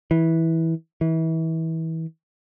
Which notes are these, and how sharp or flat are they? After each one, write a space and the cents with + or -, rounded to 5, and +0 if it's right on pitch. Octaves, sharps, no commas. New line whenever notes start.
E3 -15
E3 -30